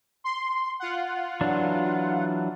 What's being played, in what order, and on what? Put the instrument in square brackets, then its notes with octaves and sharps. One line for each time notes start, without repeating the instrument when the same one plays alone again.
[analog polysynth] C6
F4 F#5
[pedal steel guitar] E3 F#3 D4